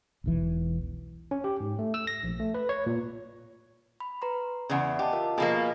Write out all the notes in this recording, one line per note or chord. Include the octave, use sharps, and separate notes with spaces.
E1 B1 E3
C#4
G4
G#2
A3
E6
A#6
A#1
A3
B4
C#5
A#2
B5
B4 A#5 C6
E2 C#3 D5 F#5 G#5
G4 D#5 A5
F4 A#4 F5
B2 F3 A#3 G#4 D#5 G#5